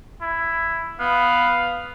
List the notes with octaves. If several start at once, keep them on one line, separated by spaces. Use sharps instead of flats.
E4
B3 F5